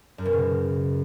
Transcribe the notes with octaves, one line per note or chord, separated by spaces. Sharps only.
F#2
B2
C#3